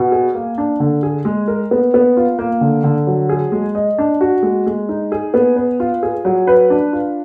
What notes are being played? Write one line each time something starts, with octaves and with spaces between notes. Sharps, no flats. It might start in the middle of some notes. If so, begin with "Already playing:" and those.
Already playing: B2
G#4
A#3
D4
D3
G#4
G#3
A#4
B3
B3
F4
A#3
D3
D3
F#3
G#4
G#3
D#5
D4
F#4
G#3
G#3
D#4
G#4
B3
B4
F4
G#4
F#3
B4
D4
F4